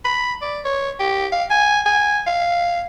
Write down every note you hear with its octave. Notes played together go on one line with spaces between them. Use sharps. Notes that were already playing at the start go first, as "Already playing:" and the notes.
B5
D5
C#5
G4
F5
G#5
G#5
F5